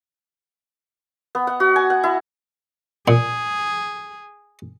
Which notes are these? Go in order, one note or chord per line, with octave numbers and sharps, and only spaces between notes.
B3
F#5
F#4
G#5
F#5
E4
A#2 G#4